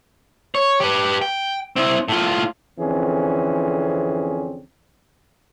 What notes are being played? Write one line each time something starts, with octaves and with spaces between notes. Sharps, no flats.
C#5
G4 B4
G5
C4 E4
A2 F4
F2 D3 E3 C4 C#4 G#4